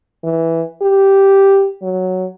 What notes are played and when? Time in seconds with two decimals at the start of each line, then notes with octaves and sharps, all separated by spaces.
0.24 E3
0.82 G4
1.82 F#3